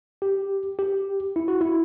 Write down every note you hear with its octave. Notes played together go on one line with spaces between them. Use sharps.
G4
G4
E4
F#4
E4